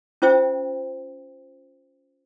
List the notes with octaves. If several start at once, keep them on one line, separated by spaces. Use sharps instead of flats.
C#4 F4 C5 E5 G5